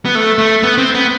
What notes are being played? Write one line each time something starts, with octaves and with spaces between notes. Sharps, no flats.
B3
A3
A3
B3
C4
B3